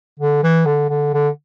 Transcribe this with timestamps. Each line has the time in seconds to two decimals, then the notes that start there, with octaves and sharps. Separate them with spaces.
0.20 D3
0.43 E3
0.66 D3
0.90 D3
1.14 D3